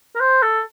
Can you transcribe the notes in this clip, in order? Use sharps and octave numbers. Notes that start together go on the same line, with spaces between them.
A#4
C5
A4